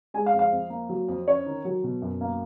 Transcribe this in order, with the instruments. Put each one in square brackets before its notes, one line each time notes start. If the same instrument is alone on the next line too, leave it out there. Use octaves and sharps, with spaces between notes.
[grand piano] G#3 G#5
F5
F2
F5
F2
A#3
F#3
F2
C#4 C#5
D#3
F#3
B2
F#2
A#3